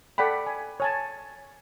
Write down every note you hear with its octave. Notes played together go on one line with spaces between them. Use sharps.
A4 D5 F#5 G5 B5
G#5
C#5 G#5 A5